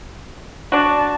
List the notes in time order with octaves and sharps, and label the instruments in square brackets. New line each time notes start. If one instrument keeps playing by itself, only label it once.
[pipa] D4 F#4 [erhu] A5